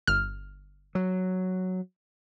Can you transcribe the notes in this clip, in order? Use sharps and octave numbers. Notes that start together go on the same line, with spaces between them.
G1 F6
F#3